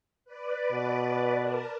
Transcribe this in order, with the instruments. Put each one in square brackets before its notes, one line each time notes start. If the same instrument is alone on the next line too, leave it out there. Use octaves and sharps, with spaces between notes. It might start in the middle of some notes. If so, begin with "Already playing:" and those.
[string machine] B4 D5
[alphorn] B2
[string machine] A#4 A5